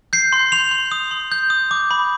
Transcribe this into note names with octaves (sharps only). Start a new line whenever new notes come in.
G6 C7
C6
C6 F7
C6
D#6
C6
G6
D#6
D6
B5